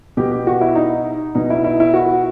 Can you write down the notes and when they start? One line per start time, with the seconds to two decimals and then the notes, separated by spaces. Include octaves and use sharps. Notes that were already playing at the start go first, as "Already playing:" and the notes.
0.17 B2 G4
0.32 G4
0.47 F#4
0.61 E4
0.75 D#4
1.35 B2 D#4
1.50 E4
1.64 E4
1.80 E4
1.94 F#4